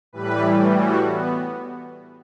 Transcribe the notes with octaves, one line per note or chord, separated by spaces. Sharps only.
A2 E3 G3 B4
F#4
B3